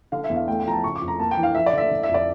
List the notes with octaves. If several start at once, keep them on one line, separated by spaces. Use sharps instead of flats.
D3 F5
E5
E2
F5
A3 G5
G5
F3 A#5
A5
C#3 C#6
D6
F2
A#5
A#3 A5
G5
E3
F5
F3 E5
D5
D3 E5
D3
E5
F2
D5